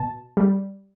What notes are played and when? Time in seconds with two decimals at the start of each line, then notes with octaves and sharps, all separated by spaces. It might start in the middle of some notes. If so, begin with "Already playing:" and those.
Already playing: B2 A5
0.37 G3